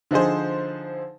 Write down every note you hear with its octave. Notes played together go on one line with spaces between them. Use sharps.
D3 F3 D#4 G#4 C5